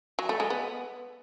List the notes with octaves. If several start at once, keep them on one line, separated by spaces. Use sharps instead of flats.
F#3
A3
G#3
B3